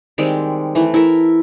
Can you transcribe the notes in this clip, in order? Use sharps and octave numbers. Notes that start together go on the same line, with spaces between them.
D#3 G3 G#3 C4
E3 A3 E4
E4 A4 A#4 E5